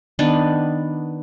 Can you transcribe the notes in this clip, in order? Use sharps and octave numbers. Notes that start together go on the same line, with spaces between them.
D#3 B3 D4